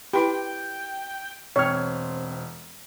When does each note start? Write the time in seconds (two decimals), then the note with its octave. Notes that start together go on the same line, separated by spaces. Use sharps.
0.13 E4 G4 B4 G5 B5
1.56 E1 C4 C#5 F6